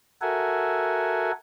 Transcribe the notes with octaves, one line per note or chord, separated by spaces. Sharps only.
F#4 A4 A#4 E5 F#5 G#5